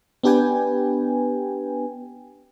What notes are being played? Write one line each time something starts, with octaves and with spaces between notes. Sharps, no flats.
B3 D4 G4 B4 G5 G#5